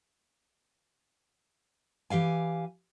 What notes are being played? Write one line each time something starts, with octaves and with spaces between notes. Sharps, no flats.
E3 G4 F5 G#5